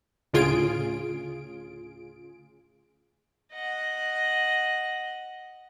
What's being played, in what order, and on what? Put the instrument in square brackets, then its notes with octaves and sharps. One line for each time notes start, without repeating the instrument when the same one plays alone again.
[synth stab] D2 A2 C#3 F4 G#4 D7
[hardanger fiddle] D#5 F#5